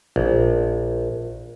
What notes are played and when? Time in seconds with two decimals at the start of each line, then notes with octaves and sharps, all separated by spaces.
0.16 A#1